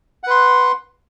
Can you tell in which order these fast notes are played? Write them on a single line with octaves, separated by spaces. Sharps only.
F#5 B4 C6